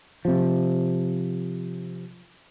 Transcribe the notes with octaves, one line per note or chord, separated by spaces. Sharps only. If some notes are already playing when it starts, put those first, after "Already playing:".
C3 F3